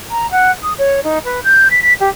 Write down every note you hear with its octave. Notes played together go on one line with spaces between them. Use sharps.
A#5
F#5
D#6
C#5
D#4
B4
G6
B6
B6
G4